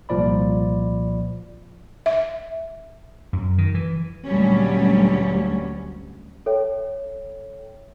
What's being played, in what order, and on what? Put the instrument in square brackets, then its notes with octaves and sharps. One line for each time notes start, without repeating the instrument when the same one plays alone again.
[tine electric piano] C2 A#2 F3 D5 B5
[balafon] E5
[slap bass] F#2
D#3
E3
[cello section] D2 A#2 F#3 G3 C#4
[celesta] A4 C#5 E5 G5